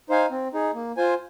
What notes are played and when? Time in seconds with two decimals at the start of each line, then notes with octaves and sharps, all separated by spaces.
0.10 D#4 C5 F5 G#5
0.31 C4
0.54 D#4 G#4
0.74 A#3
0.97 F4 C5 G#5